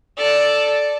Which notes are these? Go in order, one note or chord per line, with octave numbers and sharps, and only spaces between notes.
A4 D5